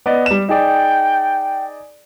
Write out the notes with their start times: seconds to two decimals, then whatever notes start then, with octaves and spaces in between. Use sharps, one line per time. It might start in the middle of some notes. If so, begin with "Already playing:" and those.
0.06 B3 D5 D#5
0.26 G3 E7
0.49 D#4 G#4 D5 G5